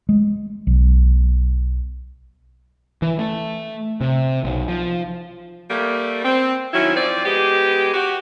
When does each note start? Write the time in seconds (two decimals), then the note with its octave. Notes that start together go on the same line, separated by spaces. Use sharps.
0.09 G#3
0.67 B1
3.02 E3
3.19 A3
4.01 C3
4.44 B1
4.68 F3
5.70 G3 A3 A#3
6.25 C4
6.73 D#3 F#3 C#4 E4
6.96 F3 C4 D5
7.25 G#3 B3 G4
7.94 F#4 G4